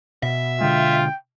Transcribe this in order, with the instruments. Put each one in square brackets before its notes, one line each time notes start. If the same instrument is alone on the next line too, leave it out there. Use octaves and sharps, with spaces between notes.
[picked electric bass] B2 [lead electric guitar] E5
[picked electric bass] B2 D3 G#3 [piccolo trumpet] F4 [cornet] G5